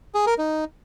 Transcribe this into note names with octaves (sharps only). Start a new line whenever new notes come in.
G#4
A#4
D#4